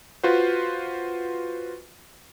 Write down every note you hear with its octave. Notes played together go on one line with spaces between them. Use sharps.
F4 F#4 B4 C5